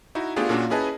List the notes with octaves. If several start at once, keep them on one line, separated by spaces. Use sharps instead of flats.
D#4 E4 F#4
A3 B3 D4 F4 G4 G#4
A#2 A#3 C#4 D4 F4 F#4
C#4 E4 G#4 B4 D#5 A5